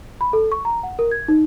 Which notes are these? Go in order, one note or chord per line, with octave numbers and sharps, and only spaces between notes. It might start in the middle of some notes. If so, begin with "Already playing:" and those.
B5
A4
C#6
A#5
F#5
A#4
G#6
D#4